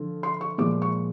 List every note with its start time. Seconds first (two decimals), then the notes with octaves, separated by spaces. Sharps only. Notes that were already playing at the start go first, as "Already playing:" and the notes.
Already playing: D3 F3
0.23 C6
0.41 C#6
0.58 A#2 F3 G#3 D6
0.82 C#6